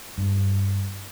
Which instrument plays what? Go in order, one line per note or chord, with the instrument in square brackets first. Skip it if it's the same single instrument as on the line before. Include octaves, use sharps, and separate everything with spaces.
[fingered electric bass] G2